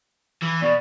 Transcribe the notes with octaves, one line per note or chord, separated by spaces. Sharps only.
E3
B2 D5